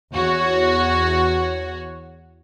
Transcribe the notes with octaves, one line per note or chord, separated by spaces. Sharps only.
E2 F#4 C#5